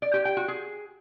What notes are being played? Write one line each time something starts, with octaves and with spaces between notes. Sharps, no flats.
D5
G4
G5
F#4
G#4